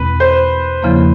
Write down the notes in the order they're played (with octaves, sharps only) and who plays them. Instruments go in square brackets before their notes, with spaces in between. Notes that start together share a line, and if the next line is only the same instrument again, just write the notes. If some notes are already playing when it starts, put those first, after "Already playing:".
Already playing: [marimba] E2 B2 G#3 C4 [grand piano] B4
[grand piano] C5
[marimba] E2 C#3 F3 A#3